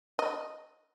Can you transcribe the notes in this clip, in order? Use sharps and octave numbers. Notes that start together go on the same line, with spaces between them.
D#5